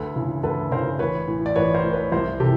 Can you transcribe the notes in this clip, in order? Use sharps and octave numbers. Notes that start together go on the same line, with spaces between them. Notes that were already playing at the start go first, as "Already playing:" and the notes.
Already playing: D2 A4 B4
C#3 E3
D2 A4 B4
C#3 E3 A#4 C5
A1 B4 C#5
A2 E3
D5
A1 B4 C#5
A#4 C5
A2 E3
B4 C#5
C2 A#4 C5
C3 E3 G4 A4